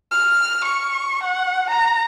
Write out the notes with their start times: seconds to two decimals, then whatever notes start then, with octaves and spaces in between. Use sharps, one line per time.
0.11 F6
0.64 C#6
1.23 F#5
1.70 A#5